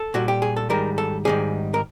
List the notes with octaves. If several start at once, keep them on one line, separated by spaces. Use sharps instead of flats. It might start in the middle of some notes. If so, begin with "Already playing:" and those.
Already playing: A4
A#2 G3 F#4
G4
G#4
A4
G#2 D#3 G3 A#4
A4
G#2 D#3 G3 G#4
A#4